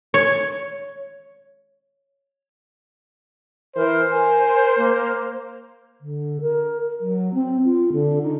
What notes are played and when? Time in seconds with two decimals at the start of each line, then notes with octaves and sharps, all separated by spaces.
0.14 C#5
3.76 E3 A#4 C5
4.11 A#4 G#5
4.77 A#3
6.01 D3
6.41 A#4
7.00 F#3
7.34 C4
7.64 F4
7.92 D3
8.22 D#4